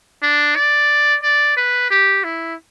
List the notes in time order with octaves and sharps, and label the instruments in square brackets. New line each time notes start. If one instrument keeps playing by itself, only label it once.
[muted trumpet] D4
D5
D5
B4
G4
E4